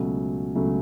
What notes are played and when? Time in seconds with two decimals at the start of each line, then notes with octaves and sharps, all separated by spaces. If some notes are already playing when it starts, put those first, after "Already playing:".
Already playing: C#2 B2 F#3 A3 C#4
0.55 C#2 B2 F#3 A3 C#4